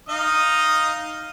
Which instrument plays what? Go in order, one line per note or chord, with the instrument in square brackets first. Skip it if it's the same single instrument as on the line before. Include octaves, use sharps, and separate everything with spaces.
[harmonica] D#4 D#5 F5